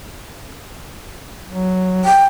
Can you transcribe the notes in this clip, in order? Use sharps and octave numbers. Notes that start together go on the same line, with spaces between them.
F#3
G5